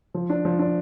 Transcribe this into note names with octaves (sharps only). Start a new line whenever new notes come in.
F3
D4
F3
D4